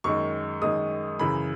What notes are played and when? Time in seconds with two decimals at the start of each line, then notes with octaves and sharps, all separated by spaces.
0.04 F#2 D#3 G#3 C#6
0.62 F#2 D#3 G#3 D#6
1.19 F#2 C#3 E3 B5